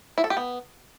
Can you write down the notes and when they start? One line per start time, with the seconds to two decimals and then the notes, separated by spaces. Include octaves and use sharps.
0.18 E4
0.24 A4
0.30 G4
0.37 B3